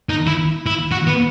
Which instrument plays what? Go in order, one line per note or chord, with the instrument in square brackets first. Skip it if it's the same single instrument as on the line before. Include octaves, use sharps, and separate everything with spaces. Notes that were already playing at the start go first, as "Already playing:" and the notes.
[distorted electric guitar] D#4
E4
E4
F#4
B3